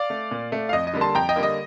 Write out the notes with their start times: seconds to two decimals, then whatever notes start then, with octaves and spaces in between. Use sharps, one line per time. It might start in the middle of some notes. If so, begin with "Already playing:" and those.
Already playing: D5 F5
0.10 A3
0.31 A#2
0.52 A3
0.69 F5
0.73 F2 D#5
0.87 D#5
0.94 D3 G3 A#3
1.01 A5 C6
1.15 F2 G5 A#5
1.29 D#5 G5
1.36 D3 G3 A#3
1.43 D#5